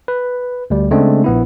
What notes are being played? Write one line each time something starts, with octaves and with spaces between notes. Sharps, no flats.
B4
D2 G3
C#3 G#3 A3 C4 D4
A#1 B3 E4